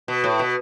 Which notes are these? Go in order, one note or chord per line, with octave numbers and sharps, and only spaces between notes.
B2
A2
B2